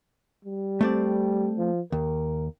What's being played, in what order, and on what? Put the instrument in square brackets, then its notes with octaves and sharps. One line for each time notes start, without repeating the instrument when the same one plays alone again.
[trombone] G3
[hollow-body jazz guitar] A3 C4 D5
[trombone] F3
[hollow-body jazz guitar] D#2 [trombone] A#4